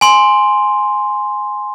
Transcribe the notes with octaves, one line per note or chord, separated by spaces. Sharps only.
G#5 C6